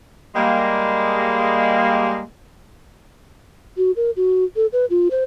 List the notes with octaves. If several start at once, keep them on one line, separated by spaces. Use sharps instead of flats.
G3 G#3 A#3
F#4
A#4
F#4
A4
B4
F4
C5